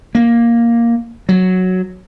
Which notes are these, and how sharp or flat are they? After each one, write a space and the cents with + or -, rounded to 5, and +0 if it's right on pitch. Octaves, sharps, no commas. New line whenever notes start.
A#3 +5
F#3 +0